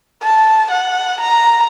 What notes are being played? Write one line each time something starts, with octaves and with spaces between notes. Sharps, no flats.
A5
F#5
A#5